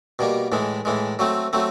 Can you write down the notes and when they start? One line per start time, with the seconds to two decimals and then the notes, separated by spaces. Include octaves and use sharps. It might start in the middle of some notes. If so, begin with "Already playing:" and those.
0.19 B2 G3 A#3
0.52 A2 E3 G#3
0.85 A2 E3 G#3
1.19 F#3 A3 C4
1.53 F#3 A3 C4